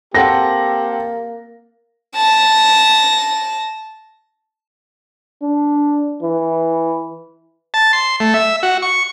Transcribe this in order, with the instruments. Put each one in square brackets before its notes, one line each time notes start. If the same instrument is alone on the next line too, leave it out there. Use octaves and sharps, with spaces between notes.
[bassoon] A#3 [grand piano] C4 A4 F#5 [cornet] G4 [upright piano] A#6
[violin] A5 A#6
[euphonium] D4
E3
[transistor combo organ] A5
C6
A3
E5
F#4
C#6